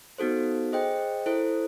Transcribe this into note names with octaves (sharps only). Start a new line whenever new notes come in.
B3 D#4 F#4 A4 C5
G#4 C5 D#5 G5
E4 A4 C5